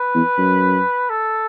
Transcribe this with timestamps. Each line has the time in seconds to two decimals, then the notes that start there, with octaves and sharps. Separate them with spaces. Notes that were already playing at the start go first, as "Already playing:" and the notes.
Already playing: B4
0.15 E2
0.38 F#2
1.10 A4